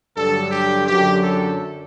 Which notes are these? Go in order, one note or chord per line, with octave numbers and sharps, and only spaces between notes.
G2 D3 F#3 A4
G4
F#2 D3 F#3 G4
A4